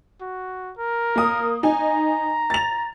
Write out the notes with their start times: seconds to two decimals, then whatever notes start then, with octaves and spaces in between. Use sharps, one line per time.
0.21 F#4
0.78 A#4
1.16 A#3 D#6
1.63 D#4 G#5 A#5
2.50 A6 F7